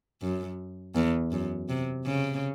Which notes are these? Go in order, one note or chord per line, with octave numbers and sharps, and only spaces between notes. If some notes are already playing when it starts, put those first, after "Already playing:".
F#2
E2
F#2
C3
C#3